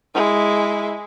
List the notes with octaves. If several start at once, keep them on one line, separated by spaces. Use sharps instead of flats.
G#3 E4